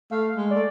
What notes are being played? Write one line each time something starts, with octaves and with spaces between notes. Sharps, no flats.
A3 F5
G#3
A3 D5